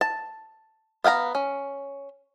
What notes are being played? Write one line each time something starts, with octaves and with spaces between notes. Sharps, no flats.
A5
B3 F5 G5 A#5
C#4